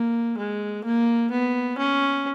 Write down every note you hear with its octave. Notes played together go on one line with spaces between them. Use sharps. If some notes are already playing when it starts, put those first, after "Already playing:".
Already playing: A#3
G#3
A#3
B3
C#4